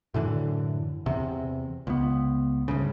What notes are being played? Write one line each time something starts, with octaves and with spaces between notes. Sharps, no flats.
F#2 A2 D3 E3
E2 C3
C#2 B3
D2 G2 C#3